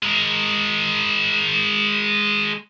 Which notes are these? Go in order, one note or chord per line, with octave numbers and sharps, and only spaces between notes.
G#3 A#4